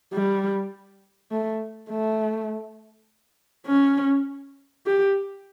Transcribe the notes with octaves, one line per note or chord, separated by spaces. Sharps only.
G3
A3
A3
C#4
G4